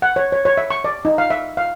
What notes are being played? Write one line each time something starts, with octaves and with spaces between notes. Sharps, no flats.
F#5
C#5
C#5
C#5
E5
C#6
D5
D#4
F5
E5
F5